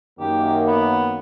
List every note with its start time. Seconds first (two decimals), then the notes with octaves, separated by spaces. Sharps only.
0.20 F#2 D#3 A#3 G4
0.67 B3